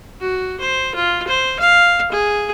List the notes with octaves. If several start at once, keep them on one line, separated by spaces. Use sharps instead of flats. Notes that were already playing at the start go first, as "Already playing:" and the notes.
F#4
C5
F4
C5
F5
G#4